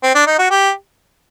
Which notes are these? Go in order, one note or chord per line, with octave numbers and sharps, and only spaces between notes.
C4
D4
D#4
F#4
G4